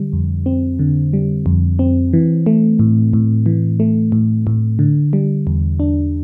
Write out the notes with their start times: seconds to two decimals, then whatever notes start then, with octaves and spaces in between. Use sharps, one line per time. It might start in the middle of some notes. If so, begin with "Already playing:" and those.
Already playing: D3 G3
0.13 F2
0.46 C4
0.79 D3
1.13 G3
1.46 F2
1.79 C4
2.13 E3
2.46 A3
2.79 A2
3.13 A2
3.46 E3
3.80 A3
4.12 A2
4.47 A2
4.79 D3
5.13 G3
5.47 E2
5.80 D4